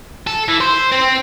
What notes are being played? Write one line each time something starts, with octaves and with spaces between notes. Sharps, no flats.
A4
E3
C5
C4